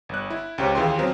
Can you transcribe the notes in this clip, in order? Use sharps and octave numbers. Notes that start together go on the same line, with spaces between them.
G1 F#6
E4
C#2 C#4 G4 C5
D#2 E3 F4 G#4 G5 C6
F3 F#3 C4 A#4